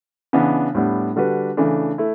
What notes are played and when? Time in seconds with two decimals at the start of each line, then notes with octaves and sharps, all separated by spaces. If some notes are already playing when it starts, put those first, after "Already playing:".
0.33 C#3 E3 B3 D4
0.75 A2 G3 B3 D4
1.16 D3 G3 D4 F#4 B4
1.57 C#3 E3 A3 D4
1.98 A3 E4